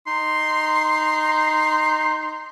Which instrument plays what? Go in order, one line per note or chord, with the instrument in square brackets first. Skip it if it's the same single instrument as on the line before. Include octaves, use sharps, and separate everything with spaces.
[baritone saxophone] D#4 [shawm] C6